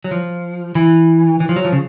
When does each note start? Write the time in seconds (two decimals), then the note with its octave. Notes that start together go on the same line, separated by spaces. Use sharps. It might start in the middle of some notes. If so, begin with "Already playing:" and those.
0.04 F#3
0.11 F3
0.75 E3
1.40 E3
1.49 F3
1.56 F#3
1.65 F3
1.72 C#3